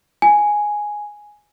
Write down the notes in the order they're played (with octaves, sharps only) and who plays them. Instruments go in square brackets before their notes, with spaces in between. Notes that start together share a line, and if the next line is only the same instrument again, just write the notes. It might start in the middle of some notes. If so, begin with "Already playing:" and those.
[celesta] G#5